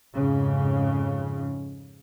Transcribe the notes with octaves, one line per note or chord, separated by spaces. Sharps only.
F2 G#2 C#3